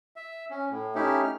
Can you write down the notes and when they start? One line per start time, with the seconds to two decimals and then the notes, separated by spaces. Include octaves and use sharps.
0.16 E5
0.50 C#4
0.71 A2
0.95 A3 C#4 D#4 E4 G4
1.23 F6